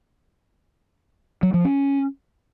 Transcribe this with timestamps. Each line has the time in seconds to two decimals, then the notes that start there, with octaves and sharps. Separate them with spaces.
1.43 F#3
1.54 F3
1.65 C#4